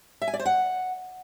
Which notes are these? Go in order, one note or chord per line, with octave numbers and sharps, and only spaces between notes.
E5
G#5
D5
C5
F#5